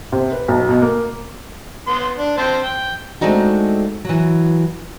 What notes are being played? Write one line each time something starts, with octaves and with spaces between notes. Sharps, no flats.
C3
B4
B1
B2
A#3
B3 C6
D4
C4 C5 A5
G5
G#3 A3 C4 D4 D#4 F#4
E3 F#3